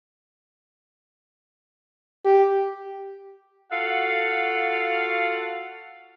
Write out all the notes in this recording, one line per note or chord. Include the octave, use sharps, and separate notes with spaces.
G4
F4 F#4 A4 F5 F#5